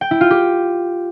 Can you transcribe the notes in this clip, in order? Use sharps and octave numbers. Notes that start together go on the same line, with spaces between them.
G5
E4
F4
G4